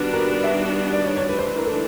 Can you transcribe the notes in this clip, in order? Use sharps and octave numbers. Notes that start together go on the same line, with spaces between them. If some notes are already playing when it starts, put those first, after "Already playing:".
Already playing: D#3 G3 B3 D4 F#4 B4
A#4
B4
B4
E5
D5
C#5
C#5
E3 A3 D4 B4
C5
B4
A#4
A4